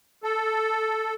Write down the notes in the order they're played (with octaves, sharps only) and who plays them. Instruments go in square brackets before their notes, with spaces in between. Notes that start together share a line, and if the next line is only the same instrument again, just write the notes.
[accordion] A4